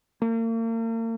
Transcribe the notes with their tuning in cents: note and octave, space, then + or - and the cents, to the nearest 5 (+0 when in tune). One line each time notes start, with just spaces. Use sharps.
A#3 -40